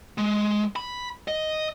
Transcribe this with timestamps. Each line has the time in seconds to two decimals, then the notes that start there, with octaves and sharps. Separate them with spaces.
0.18 G#3
0.76 B5
1.28 D#5